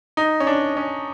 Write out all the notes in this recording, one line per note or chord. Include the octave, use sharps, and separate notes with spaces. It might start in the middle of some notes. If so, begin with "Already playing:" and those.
D#4
C#4
D4
C#4